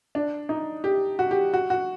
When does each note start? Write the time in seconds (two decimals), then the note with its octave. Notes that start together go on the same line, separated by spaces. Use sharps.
0.15 D4
0.49 D#4
0.84 G4
1.19 F#4
1.31 G4
1.54 F#4
1.70 F#4